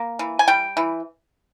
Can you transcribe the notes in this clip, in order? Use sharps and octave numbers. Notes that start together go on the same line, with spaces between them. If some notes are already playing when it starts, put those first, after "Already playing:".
Already playing: A#3
E3
G#5
G3 G5
E3